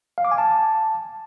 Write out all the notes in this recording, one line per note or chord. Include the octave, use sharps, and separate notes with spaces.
F5
D6
G#5
A5